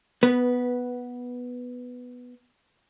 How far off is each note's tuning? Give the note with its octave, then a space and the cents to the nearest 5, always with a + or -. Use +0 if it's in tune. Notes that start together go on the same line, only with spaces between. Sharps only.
B3 +0 B4 -15